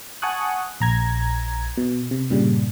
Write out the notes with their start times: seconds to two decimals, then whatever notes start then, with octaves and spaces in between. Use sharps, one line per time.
0.22 F#5 G#5 A5 C#6 D#6 F#6
0.80 A#1 A#5 G#6
1.78 B2
2.11 C3
2.30 G2 A#2 C#3 G3